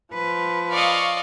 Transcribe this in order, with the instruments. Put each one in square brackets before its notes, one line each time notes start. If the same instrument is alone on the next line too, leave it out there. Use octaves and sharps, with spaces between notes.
[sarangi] F3 [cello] B4
[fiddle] D5 D#5 [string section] F5 C#6